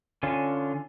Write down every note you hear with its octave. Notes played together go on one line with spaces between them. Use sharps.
D3 C#4 F4